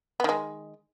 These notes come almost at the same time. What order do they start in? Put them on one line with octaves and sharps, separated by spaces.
B3 D#3 G#3